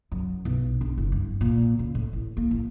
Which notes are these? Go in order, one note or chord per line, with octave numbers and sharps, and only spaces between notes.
F#2
B1
D4
F#1
G2
A#2
C#3
A2
A1
A#3
A1